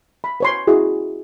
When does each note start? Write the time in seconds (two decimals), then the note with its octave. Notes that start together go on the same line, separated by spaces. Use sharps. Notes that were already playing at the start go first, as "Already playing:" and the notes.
0.24 B5
0.40 B4 C#5 C6
0.67 E4 F#4 G#4